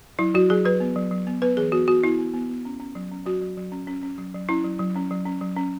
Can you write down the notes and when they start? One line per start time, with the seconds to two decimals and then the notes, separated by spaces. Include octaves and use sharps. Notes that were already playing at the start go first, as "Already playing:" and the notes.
0.19 F#3 E4
0.34 F#3 F#4
0.50 F#3 G#4
0.65 F#3 B4
0.80 B3
0.96 F#3
1.11 F#3
1.27 B3
1.42 B3 B4
1.57 E3 G#4
1.72 B3 F#4
1.88 B3 F#4
2.04 B3 E4
2.19 B3
2.33 B3
2.50 B3
2.65 C#4
2.80 C#4
2.95 F#3
3.11 C#4
3.26 F#3 F#4
3.41 F#3
3.57 F#3
3.72 C#4
3.87 C#4
4.03 C#4
4.18 F#3
4.34 F#3
4.49 C#4 E4
4.64 F#3
4.79 F#3
4.96 C#4
5.11 F#3
5.25 C#4
5.41 F#3
5.56 C#4